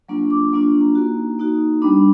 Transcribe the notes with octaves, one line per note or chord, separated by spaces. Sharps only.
F#3 A#3 D4 F4 C#6
D6
F#3 A#3 D4 F4 C#6
A#5
A#3 D#4 F#4
A#3 D#4 F#4
G3 B3 D4 B5